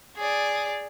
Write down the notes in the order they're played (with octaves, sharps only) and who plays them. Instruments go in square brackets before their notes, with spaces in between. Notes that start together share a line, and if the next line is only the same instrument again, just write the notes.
[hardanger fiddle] G#4 D5